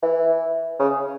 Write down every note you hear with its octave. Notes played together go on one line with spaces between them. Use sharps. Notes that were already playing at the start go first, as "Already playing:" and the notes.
E3
C#3